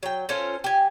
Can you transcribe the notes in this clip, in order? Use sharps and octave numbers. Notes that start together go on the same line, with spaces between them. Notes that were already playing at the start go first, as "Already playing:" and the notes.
F#3 G5
C#4 F4 A4 C5
G4 G#5